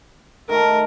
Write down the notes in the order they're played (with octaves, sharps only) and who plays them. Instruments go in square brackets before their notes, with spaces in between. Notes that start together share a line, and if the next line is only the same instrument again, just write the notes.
[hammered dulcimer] D#3 A3 [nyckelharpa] A#4